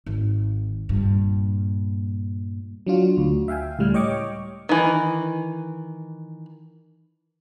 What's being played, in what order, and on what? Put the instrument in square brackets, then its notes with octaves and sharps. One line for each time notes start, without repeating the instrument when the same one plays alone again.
[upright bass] G#1
G2 A#2
[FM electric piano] F#3 D4 F4 F#4
D2
E5 F5 G5 G#5
C#2 A2 G3 F6
C#5 D#5 G5 C#6 D6
[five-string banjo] D#3 E3